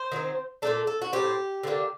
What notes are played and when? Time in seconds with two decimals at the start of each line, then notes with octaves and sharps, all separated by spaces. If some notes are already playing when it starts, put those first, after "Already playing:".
Already playing: C5
0.12 D#3 F#3 C4
0.62 A#2 A3 D4 A4
0.87 A4
1.02 F#4
1.13 A2 F#3 C4 G4
1.63 D3 F#3 A#3 D4